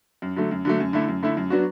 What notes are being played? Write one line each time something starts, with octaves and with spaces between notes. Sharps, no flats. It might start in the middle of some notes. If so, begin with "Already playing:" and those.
F#2
D3 F#3 A3
F#2
D3 F#3 A3
F#2
D3 A3 E4
F#2
D3 A3 E4
F#2
F#3 B3 D4 F#4